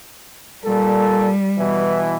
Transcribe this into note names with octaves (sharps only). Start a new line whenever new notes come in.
A#2 G3 A4
B2 E3